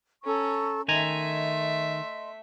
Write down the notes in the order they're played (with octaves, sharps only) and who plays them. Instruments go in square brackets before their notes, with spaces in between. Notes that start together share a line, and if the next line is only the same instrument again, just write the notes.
[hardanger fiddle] C#4 [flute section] A4 A#5 C#6
[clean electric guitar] D#3 G#5 A#5 [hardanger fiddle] A3 E5 [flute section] D#5 C6